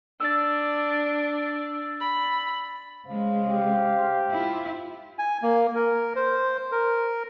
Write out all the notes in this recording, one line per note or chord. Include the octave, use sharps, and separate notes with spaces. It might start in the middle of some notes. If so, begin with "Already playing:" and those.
D4 E6 A6
B5
C#3 G#3 C5 F5
G4
E4 F4
G#5
A#3
A#4
C5
A#4